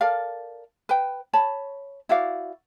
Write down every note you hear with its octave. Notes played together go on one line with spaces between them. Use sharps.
A4 A#4 D5 F5
B4 G5
C#5 A5 B5
E4 F#4 D5 F5